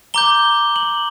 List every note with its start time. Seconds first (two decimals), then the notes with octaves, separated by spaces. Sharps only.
0.14 A#5 D6 G6 G7
0.76 F#7